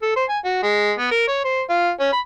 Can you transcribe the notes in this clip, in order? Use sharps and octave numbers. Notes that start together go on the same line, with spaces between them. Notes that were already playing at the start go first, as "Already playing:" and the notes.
A4
C5
G#5
F#4
G#3
B3
A#4
C#5
C5
F4
C#4
B5